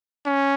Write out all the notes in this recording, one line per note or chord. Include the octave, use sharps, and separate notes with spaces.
C#4